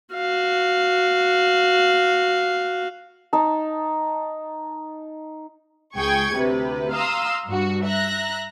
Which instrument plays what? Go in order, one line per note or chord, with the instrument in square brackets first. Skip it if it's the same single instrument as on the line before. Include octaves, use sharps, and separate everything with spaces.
[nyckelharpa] F#4 F5
[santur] D#4 A5
[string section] C#2 G#4 G5 C#6 G#6
D2 C3 B4
F5 A#5 C6 D#6 E6
G2 F#4
E5 A#5 F#6 A#6